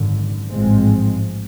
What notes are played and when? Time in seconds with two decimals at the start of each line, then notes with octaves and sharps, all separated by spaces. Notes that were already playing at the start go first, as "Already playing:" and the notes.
Already playing: G#1 F#2 D3
0.51 A1 G#2 F3 G#3 C4